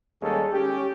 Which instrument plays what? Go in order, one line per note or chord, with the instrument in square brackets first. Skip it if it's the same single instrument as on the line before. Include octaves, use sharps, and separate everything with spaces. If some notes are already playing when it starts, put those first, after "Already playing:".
[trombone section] D#2 G3 G#3 C#4 G#4 A4
C#4 G4